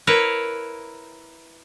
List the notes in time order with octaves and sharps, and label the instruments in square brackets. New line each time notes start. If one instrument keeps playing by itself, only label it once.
[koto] E4 A#4 B4 C#5